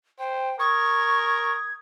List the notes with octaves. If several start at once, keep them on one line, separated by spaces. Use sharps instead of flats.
C5 G5
A#4 C#6 D#6 G#6